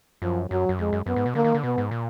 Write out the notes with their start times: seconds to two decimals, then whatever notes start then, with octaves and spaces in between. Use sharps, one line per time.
0.22 F#2 F3
0.50 F#2 F#3
0.69 F#2
0.79 F2 G#3
0.93 F#2
1.06 F#2 B3
1.16 G#2
1.26 B2
1.35 D3 A#3
1.44 D#3
1.55 D3
1.63 B2 B3
1.78 G#2
1.91 A#2